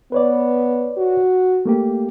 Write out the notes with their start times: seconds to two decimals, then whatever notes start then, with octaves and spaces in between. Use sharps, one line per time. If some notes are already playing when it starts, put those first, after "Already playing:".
0.12 B3 B4 C#5 D5
0.98 F#4
1.65 A3 A#3 G4